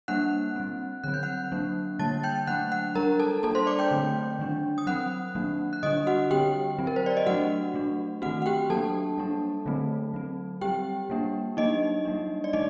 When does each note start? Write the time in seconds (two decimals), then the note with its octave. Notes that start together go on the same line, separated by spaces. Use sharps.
0.08 G3 A#3 D4 F#5 F#6
0.56 G3 C4
1.04 D3 F#3 C4 F#6
1.14 G6
1.23 F#5 F#6
1.52 F#3 A#3 D4
1.99 D3 G3 A#3 A5 A6
2.23 G5 G6
2.47 F#3 A3 D4 F#5 F#6
2.72 F#5 F#6
2.95 G3 D4 A#4 A#5
3.19 A4 A5
3.43 G3 A#3 D4 A4 A5
3.55 C5 C6
3.67 D5 D6
3.79 G5 G6
3.91 D3 F#3 A3 C4
4.39 D#3 G3 D4
4.78 D#6
4.87 F#3 C4 F#5 F#6
5.35 D#3 F#3 A#3 D4
5.73 F#6
5.83 D3 G3 D4 D#5 D#6
6.07 F#4 F#5
6.31 D3 G3 C4 G4 G5
6.79 F#3 C4
6.87 A#4
6.96 C5
7.06 D5
7.17 D#5
7.26 F#3 A3 D4 F#4 F#5
7.74 F#3 A3 D4
8.22 D#3 A3 C4 F#4 F#5
8.42 F#5
8.46 G4 G5
8.70 F#3 A#3 D4 A4 A5
9.18 G3 A#3 D4
9.66 D3 F#3 A3 C4
10.14 F#3 C4
10.61 G3 C4 G4 G5
11.10 G3 A#3 D4
11.57 F#3 A#3 D4 D#4 D#5
12.05 G3 A#3 D4
12.44 D5
12.53 D#3 A3 D#4 D#5